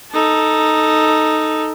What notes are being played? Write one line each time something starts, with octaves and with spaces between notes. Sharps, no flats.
D#4 A4